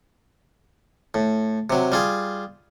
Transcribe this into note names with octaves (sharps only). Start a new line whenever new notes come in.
A2
C3 F#3
G3 F4 G#4